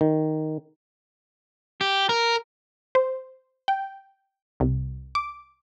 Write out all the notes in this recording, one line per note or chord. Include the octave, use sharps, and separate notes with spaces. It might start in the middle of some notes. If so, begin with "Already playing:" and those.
D#3
G4
A#4
C5
G5
C2
D6